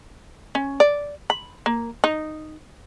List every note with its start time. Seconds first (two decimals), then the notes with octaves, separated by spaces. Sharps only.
0.55 C#4
0.80 D5
1.30 B5
1.66 A#3
2.04 D#4